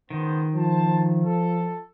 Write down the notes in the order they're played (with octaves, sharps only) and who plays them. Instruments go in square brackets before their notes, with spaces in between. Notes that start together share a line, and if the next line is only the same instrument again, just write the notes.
[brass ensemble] C#2 B3 C5 [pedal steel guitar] D#3
[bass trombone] F3 [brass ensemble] C5 A5
[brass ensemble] A4